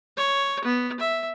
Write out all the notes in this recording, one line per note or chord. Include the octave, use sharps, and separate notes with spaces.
C#5
B3
E5